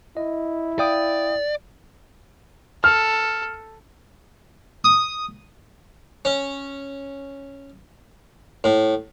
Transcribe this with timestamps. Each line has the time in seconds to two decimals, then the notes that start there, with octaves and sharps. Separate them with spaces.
0.17 E4 D#5
0.79 D5 F5 G5 D#6
2.84 A4 F6
4.84 D#6
6.25 C#4
8.64 A2